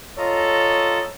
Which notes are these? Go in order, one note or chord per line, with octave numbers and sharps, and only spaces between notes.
F4 A4 C#5 D#5 A#5